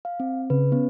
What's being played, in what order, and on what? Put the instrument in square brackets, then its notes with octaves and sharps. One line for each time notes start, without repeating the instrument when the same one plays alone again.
[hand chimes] F5
C4
[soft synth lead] C#3 [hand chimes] B4
[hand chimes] B3 C#4